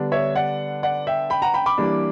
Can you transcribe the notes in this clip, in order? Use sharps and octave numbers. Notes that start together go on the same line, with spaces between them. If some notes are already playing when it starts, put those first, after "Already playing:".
Already playing: D3 G3 B3 D4
C#5 E5
D5 F#5
D5 F#5
E5 G5
G5 B5
F#5 A#5
G5 B5
B5 D6
E3 G3 A#3 D4